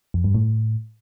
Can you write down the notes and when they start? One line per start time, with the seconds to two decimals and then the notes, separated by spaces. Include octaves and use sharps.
0.14 F2
0.24 G2
0.35 A2